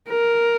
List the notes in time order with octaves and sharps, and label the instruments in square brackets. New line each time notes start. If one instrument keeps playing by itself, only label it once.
[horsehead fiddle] A#4